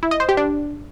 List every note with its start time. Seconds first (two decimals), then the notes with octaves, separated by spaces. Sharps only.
0.03 E4
0.11 D#5
0.20 C5
0.29 G4
0.37 D4